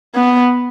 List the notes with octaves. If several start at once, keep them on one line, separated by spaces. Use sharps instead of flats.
B3